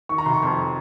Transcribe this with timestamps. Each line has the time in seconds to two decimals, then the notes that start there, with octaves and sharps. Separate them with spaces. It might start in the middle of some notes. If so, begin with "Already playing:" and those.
0.09 D#3 C#6
0.18 A#5
0.26 F1 C6
0.34 C#6
0.42 F2 C6